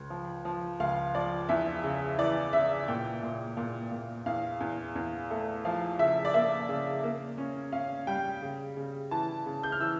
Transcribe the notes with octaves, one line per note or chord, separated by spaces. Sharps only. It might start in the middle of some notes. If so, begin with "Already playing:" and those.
Already playing: C#2
F3
F3
C#2 F5
F3 D5
E2 E5
C#3
E3 D5
C#3 E5
A#2 G5
A#2
A#2
A#2
E2 F5
E2
E2
A3
F3 F5
C#3 E5
D5
A#3 E5
C#3
A#3
C#4
C#4 F5
G3 G5
C#3
C#3
E3 A5
C#3
G6
F6
E3 E6